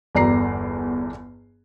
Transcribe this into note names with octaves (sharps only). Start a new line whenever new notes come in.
G1 E2 D5 A#5 C7